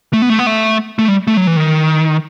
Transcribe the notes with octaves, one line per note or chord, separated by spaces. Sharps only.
A3
B3
A3
B3
A3
A3
G3
A3
F#3
E3
D#3